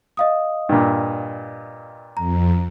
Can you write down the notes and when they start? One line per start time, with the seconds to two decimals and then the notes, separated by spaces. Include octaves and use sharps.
0.17 D#5 F5 D#6
0.69 G2 A#2
2.17 F2 A#5